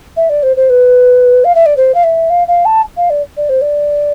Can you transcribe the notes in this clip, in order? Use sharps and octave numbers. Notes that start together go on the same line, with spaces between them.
E5
D5
C5
C5
B4
F5
E5
D5
C5
F5
E5
F5
F5
A5
F5
D5
D5
C5
D5